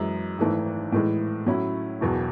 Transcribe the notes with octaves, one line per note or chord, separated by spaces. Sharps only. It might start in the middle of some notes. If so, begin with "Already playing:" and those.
Already playing: F#2 E3 G#3
G#1 G#2 E3 A3
A2 E3 G#3
A2 F#3 C#4 E4
E1 E2 B2 F#3